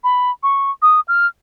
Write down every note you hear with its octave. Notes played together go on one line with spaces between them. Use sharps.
B5
C#6
D#6
F6